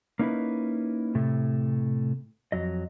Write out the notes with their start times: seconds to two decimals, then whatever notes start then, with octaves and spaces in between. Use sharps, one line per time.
0.19 A#3 C#4 D#4 E4 A4 B4
1.15 A2 C3 A3
2.52 F2 F#3 D#5